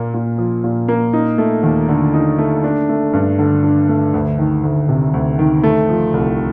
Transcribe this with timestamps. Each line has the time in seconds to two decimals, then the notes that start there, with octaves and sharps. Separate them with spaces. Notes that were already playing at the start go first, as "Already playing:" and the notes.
Already playing: A#2 A#3
0.14 A#2
0.38 F3
0.64 A#2
0.88 A#3
1.13 D#4
1.38 A3
1.63 D#2
1.88 D3
2.14 D#4
2.38 A3
2.64 D4
2.89 A3
3.13 G2
3.39 D3
3.63 D4
3.89 A3
4.14 D2
4.39 D#3
4.63 D2
4.89 C3
5.13 D2
5.39 D#3
5.63 A3
5.89 F3
6.14 C2